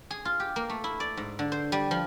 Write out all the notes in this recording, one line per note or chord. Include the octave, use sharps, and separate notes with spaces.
G#4
F4
G4
A#3
A3
E4
D5
G#2
D3
C5
G3
F3